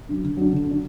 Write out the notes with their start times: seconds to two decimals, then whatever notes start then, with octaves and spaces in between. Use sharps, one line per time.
0.09 F#3 D4
0.24 D3
0.37 F#3 D4
0.53 D3
0.67 F#3 D4